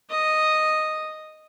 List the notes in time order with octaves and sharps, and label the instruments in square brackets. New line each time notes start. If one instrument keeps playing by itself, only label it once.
[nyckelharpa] D#5